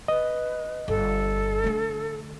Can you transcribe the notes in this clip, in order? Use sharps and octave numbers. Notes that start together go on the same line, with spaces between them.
B4 D#5
G1 A4
D3 A3